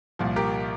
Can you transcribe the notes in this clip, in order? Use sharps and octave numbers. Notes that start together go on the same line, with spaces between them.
C2 A#2 F3
G4 A#4